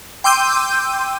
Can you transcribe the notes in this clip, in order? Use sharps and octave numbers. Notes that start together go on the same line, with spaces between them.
G5 C6 D6 E6 G6 D#7